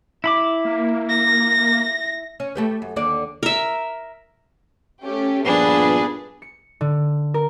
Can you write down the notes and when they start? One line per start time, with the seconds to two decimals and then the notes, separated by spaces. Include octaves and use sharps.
0.24 E4 B5 D6
0.65 A#3
1.09 A#6
2.40 C#4
2.55 A3 G4 B4
2.82 F#2
2.96 D#2 D3 D5
3.43 A#4 E5
5.04 A3 C#4 G4
5.46 G2 A#2 F3 B3 D4 G#4 B4
6.42 C#7
6.81 D3
7.34 A#4